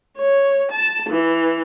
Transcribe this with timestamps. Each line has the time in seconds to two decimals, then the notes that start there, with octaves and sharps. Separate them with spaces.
0.16 C#5
0.72 A5
1.09 E3